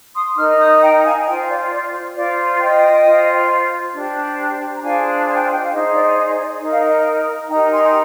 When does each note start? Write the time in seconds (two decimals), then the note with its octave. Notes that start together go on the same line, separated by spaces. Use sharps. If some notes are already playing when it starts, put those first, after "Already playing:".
0.15 C6 D#6
0.37 D#4 D6 F6
0.40 A#4
0.59 D#6 G6
0.82 G5 A#5
1.04 F5 G#5
1.22 F5
1.26 F4 D#5 G5
1.31 C5
1.48 D5 F5
1.71 D5
2.16 F4 C5 D5 F5
2.60 D#5 G5
3.04 F4 C5
3.94 D4 G4 C5
4.76 A#5
4.83 D4 F4 G#4 C5 F5 G#5
5.27 G#5
5.35 G5
5.44 F5
5.51 D#5 G5
5.62 F5
5.72 D#4 G#4 C5 D#5
5.94 D5
6.17 D#5
6.38 D5
6.61 D#4 A#4 D#5
6.71 F5
6.81 D#5
7.50 D#4 G4 A#4 G5 A#5
7.72 G#5 C6